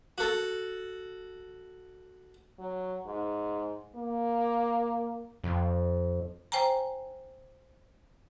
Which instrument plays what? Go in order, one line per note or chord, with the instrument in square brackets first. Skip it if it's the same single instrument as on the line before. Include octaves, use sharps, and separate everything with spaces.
[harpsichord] F#4 A4
[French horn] F#3
G#2
A#3
[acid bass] F2
[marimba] C5 G5 G#5 A#5